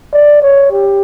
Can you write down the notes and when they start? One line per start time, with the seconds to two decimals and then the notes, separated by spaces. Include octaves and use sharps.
0.13 D5
0.42 C#5
0.72 G4